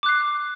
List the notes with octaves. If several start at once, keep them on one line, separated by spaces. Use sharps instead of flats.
D6 F#6 C7